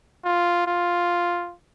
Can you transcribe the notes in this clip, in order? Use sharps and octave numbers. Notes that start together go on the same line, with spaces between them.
F4
F4